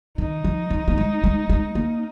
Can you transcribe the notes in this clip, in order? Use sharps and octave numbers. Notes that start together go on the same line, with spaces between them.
D#3 D#4
F3
F3
A#3
G#3
G#3
G#3
A#3